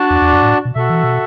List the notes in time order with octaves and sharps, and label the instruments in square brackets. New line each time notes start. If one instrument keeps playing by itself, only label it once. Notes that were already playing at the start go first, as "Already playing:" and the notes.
Already playing: [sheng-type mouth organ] D4 F#4 D5 A5
[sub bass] E2
E2
F#2
A2
B2
[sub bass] B2 [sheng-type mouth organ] F#4 A4 E5
[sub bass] E3
B2